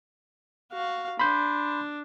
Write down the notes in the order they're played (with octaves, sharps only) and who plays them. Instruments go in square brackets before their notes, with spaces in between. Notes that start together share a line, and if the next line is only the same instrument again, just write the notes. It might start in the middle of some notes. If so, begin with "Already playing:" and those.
[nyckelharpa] F#4 F5
[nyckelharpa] D4 [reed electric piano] B5 C6 G6